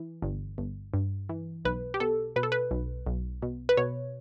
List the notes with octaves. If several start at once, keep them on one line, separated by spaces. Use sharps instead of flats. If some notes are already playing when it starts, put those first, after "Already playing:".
Already playing: E3
G1
G1
G2
E3
B1 B4
G4
B2 A4
B2 B4
A4
B4
B1
B1
B2
B4
B2 C#5